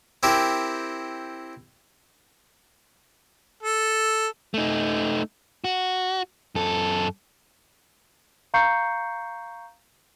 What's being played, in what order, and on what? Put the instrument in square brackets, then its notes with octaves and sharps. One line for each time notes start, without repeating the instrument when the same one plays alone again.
[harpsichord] C4 E4 G4 A#4
[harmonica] A4
[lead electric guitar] A3 D#4
F#4
F#2 A4
[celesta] F5 A#5 C#6 G6 C7 C#7